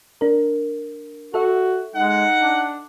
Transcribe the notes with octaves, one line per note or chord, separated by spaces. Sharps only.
D4 A#4
F#4 A4 E5
G#3 D#4 F#5
D4